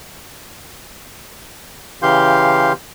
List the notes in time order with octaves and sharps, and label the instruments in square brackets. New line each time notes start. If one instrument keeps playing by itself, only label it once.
[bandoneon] C#3 E3 G4 F5 C6 G6